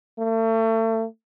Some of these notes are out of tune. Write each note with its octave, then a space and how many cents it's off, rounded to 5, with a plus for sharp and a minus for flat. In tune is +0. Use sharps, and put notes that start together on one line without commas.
A3 +35